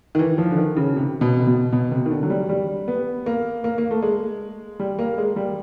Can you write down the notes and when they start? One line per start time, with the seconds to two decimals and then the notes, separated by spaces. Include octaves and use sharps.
0.15 D#3
0.19 E3
0.38 F3
0.51 D3
0.58 D#3
0.76 C#3
0.96 C3
1.21 B2
1.40 C3
1.47 B2
1.73 B2
1.92 C3
2.06 D#3
2.10 D3
2.23 F#3
2.30 G3
2.49 G3
2.88 B3
3.26 A#3
3.64 A#3
3.78 A#3
3.91 A3
4.02 G#3
4.80 G3
4.99 A#3
5.18 G#3
5.36 G3